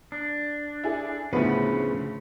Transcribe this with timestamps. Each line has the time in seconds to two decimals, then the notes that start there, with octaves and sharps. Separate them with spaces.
0.12 D4
0.84 E4 G#4 A4
1.33 D2 A2 C#3 F3 B3 E4 B4